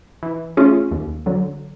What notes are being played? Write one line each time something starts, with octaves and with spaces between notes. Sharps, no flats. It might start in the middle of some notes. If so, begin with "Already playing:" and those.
E3
A3 C#4 F4 G#4
D#2
D3 F#3